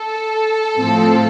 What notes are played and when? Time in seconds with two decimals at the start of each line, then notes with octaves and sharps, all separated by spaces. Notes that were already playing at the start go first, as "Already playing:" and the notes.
Already playing: A4
0.77 A2 F3 C4